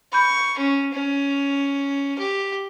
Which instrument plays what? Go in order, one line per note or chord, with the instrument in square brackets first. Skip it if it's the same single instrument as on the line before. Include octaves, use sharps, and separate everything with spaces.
[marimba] B5 G6 [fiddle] C#6
[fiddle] C#4
C#4
G4